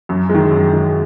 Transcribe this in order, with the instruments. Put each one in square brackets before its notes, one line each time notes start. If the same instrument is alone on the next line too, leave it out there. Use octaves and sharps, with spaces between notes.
[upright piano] F#2
D#3 G#3
F#2
D#3 G#3